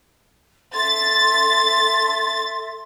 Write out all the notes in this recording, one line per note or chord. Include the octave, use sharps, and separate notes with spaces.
A4 E5 C6 A6